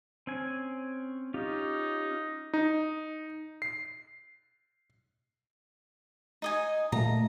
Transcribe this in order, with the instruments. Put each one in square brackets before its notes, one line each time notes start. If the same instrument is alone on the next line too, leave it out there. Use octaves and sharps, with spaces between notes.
[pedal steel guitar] C4 C#4 G#5
[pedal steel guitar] C#4 F4 G4 [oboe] D#4
[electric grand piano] D#4
C7
[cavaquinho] D#4 D#5 G#5
[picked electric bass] A#2 A3 [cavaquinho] A#5